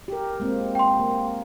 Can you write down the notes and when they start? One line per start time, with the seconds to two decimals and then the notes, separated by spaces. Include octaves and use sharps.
0.08 G4 A#4
0.40 G#3 A#3 C4
0.75 G5 C6
1.00 A#3